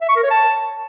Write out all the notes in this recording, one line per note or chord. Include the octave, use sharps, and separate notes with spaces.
E5
C#6
A#4
C#5
A5